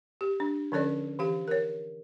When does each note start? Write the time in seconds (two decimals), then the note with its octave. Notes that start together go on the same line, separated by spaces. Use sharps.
0.21 G4
0.40 D4
0.72 D3 F3 C#4 A4 C#5 D5
1.19 E3 G4 F5
1.48 A#4 C#5